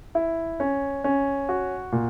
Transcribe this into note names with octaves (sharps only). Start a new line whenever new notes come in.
E4
C#4
C#4
F#4
A#2